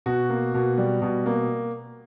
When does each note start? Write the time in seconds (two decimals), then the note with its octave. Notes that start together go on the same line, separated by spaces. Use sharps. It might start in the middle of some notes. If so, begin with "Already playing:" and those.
0.06 B2 F#4
0.30 A#3
0.54 B2
0.78 G3
1.02 B2
1.26 A#3